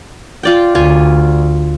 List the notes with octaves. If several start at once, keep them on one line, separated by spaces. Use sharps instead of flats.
F4 D5 G5
D2 F4 G#5